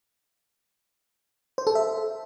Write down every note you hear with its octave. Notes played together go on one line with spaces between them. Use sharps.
C5
A4
E5